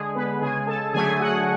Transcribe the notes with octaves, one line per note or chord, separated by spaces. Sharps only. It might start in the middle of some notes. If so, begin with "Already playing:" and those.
Already playing: D3 G#3 G#4
B3 B4
C#3 G#3 G#4 G#5
A4 A5
D3 F#3 A3 G#4 G#5
F#4 F#5